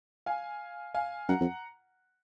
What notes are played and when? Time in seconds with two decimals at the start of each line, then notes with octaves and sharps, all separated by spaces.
0.26 F5 G#5
0.94 F5 G#5
1.29 F#2 F#5 A#5
1.41 F2